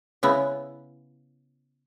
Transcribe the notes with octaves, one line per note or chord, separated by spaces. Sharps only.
C#3 B3 E4